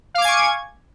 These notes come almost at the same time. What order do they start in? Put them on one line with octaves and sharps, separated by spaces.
F5 D6 G#6 G#5 C#6